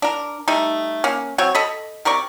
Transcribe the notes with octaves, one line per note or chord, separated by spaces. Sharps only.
D4 A#4
G3 A3 D#4
A#3 C#4
F#3 C4 C#5
A4 D#5 B5
C3 A#4 D5 C#6